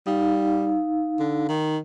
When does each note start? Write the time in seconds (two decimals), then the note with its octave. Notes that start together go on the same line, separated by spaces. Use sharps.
0.07 G3 D#4 F5
1.19 D3
1.48 D#3